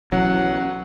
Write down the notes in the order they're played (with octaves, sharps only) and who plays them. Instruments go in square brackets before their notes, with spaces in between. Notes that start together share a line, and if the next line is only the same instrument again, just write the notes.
[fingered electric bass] B1 E3 C#4 [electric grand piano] F#3 [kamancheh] F#5